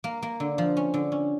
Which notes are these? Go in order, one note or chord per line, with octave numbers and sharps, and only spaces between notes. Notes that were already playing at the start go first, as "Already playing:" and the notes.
A#3
A#3
D3
F3
C#4
D3
C#4